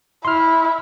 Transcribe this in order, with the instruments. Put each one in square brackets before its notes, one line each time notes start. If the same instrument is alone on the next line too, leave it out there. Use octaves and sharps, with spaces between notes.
[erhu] E4 [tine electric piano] C6 F6